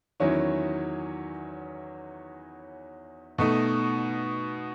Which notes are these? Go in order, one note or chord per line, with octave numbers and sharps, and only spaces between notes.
E2 D#3 F#3 C#4 E4
B2 A3 D#4